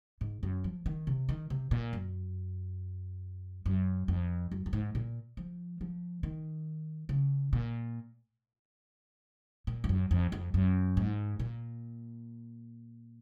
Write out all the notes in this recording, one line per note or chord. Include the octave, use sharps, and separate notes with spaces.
G#2
F#2
F3
D#3
C3
D#3
C3
A#2
F#2
F#2
F2
F#2
F#2
G#2
A#2
F3
F3
D#3
C#3
A#2
A#2
F2
F#2
F2
F2
F#2
G#2
A#2